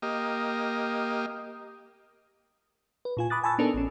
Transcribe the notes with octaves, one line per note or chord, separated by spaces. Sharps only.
A#3 G4 D#5
B4
A#2 F4 G#5
B5 D6 D#6 F#6 A6
G#5 A5 B5 C#6 E6 A6
B3 D4 D#4 A4 A#4
A1 C#4